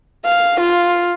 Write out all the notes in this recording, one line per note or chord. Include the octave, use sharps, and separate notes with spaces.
F5
F4